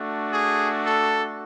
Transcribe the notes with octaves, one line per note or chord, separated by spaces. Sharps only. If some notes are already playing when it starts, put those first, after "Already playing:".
Already playing: A3 D4 F#4
G#4
A4